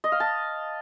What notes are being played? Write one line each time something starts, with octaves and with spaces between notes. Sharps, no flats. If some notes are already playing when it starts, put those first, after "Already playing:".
D#5
F5
A5